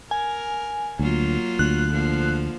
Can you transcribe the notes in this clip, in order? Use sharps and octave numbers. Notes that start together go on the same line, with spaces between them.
A#4 G#5
D2 F#3 A#3 F4
D2 F#6
D3 F3 A#3